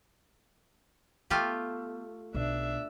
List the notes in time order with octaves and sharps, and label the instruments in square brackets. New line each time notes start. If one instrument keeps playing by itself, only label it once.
[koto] A3 F4 G4 [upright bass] B3
[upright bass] B1 [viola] D4 E5